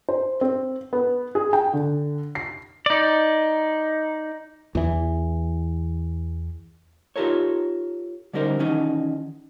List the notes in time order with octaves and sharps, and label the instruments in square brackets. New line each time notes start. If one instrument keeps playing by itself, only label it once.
[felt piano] C5
C4
B3
G#4
G5
D3
C7
[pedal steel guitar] D#4 D5
[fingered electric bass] E2 E3
[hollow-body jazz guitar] D#4 F4 G4 A4 A#4 C#5
D3 G3 C#4 D#4 A#4 C5
D#3 E3 C#4 D#4